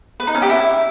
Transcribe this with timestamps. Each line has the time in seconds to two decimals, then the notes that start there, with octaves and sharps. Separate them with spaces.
0.20 B4
0.27 D#4
0.35 C#4
0.42 G4
0.50 E4